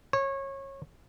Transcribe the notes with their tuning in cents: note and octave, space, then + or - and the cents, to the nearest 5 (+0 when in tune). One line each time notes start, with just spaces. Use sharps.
C#5 -25